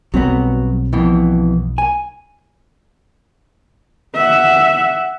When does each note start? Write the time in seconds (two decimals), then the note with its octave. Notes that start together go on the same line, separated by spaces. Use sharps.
0.14 B1 F#3 G3 B3 C4
0.93 F2 B2 E3
1.78 G#5
4.15 E5 F#5